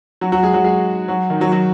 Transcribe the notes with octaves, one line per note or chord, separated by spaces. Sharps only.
F#3 F#4
F#3 F#4
G#3 G#4
F#3 F#4
G#3 G#4
F#3 F#4
D#3 D#4
F#3 F#4
F#3 F#4